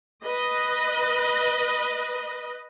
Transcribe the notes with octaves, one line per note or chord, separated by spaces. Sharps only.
B4 D#5